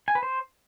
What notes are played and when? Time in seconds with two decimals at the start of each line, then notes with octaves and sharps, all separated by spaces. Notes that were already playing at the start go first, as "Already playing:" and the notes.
0.08 G#5
0.15 B4
0.23 C5